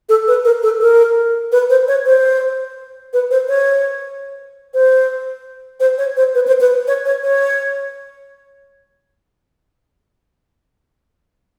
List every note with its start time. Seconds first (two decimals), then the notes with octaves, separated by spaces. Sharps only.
0.09 A4
0.27 B4
0.45 A#4
0.63 A4
0.81 A#4
1.52 B4
1.70 C5
1.88 C#5
2.06 C5
3.13 B4
3.31 C5
3.48 C#5
4.74 C5
5.80 C5
5.98 C#5
6.17 C5
6.35 B4
6.47 C5
6.60 B4
6.87 C#5
7.05 C#5
7.23 C#5